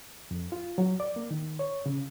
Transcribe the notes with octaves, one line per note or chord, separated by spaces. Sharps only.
F2
F4
F#3
D5
A#3
D#3
C#5
C#3